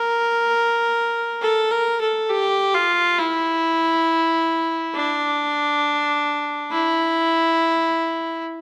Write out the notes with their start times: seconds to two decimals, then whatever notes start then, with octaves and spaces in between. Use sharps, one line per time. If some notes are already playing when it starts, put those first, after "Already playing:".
Already playing: A#4
1.42 A4
1.71 A#4
2.01 A4
2.30 G4
2.74 F4
3.18 E4
4.95 D4
6.71 E4